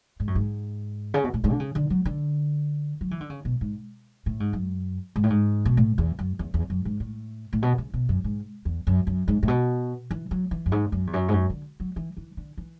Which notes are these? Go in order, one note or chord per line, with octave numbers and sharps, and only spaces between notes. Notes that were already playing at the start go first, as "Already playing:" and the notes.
G#2
F#2
G#2
C#3
B2
A2
G#2
D3
C#3
D3
F#3
D3
F#3
E3
D3
C#3
B2
G#2
A2
G#2
F#2
G#2
A2
G#2
B2
A2
E2
F#2
E2
E2
F#2
G#2
A2
A2
B2
C#3
B2
F#2
G#2
E2
F#2
F#2
G#2
A2
B2
E3
F#3
E3
F#2
G#2
F#2
E2
F#2
G#2
F#2
D3
F#3
E3
E3
D3
E3